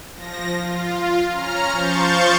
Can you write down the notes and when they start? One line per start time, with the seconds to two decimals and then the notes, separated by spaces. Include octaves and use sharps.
0.15 F3 A#6
0.56 F4
1.29 C#4 A#5 F6
1.72 F3 C5 F5 C#6 G6 A6